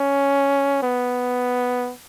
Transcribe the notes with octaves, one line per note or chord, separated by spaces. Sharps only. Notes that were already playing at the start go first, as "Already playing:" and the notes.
Already playing: C#4
B3